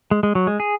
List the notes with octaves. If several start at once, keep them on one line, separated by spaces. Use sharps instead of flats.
G#3
G#3
F#3
G#3
G#4